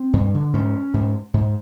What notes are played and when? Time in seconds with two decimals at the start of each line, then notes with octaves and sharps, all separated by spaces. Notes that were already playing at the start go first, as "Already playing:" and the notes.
Already playing: C4
0.13 G2
0.34 D3
0.54 G#2 C#4
0.94 G#2
1.34 G#2